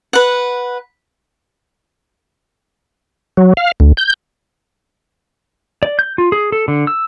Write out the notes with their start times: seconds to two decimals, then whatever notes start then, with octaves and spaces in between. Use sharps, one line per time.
0.13 B4 F#5
3.37 F#3
3.57 F5
3.80 D2
3.97 G6
5.83 D5
5.99 G6
6.18 F4
6.32 G#4
6.52 A4
6.68 D3
6.87 E6